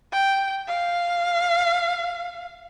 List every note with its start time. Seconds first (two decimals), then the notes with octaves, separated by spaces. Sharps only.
0.12 G5
0.68 F5